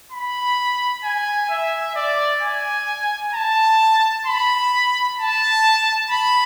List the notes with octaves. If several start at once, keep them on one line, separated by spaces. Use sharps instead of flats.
B5
G#5
E5
D5
G#5
A5
B5
A5
B5